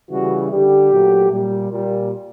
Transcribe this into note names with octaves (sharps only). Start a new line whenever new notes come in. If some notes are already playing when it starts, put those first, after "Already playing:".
C#3 E3 G3 F#4
D3 G3 G4
A#2 F#3 A3
A#2 G3
A#2 G3